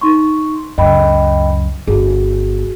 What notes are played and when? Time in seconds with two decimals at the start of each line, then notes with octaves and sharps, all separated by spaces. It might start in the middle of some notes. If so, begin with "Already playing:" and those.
0.01 D#4 C6 C#6
0.78 C#2 F#2 D#5 G5 B5
1.87 G1 F#4 G#4